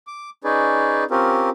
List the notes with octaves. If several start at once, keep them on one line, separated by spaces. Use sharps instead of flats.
D6
C#4 D#4 G#4 B4 D5
C4 C#4 F4 G4 A#4